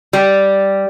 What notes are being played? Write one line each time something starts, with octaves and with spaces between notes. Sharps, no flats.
G3